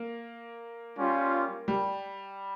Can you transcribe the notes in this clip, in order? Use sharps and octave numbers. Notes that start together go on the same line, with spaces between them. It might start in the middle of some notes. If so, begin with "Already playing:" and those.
Already playing: A#3
G3 C#4 F4
G3